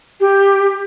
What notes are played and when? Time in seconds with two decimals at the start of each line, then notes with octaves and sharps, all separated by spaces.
0.20 G4